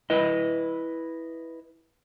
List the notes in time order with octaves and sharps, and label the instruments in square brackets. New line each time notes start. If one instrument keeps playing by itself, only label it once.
[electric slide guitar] E4 B4 D#5